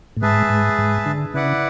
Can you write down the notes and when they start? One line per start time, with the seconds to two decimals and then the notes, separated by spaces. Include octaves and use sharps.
0.17 A2
0.22 G#2 G#4 B4 E5 A5
0.50 G#2
0.78 G#2
1.06 D3
1.34 C#3 E4 B4 D5 F#5